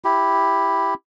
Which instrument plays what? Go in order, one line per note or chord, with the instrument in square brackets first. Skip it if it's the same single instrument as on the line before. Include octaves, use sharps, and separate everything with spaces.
[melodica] E4 G4